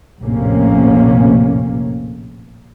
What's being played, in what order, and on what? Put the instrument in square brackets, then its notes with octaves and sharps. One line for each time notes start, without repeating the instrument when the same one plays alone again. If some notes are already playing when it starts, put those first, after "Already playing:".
[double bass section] A#1 F2 A2 C3 A#3 C#4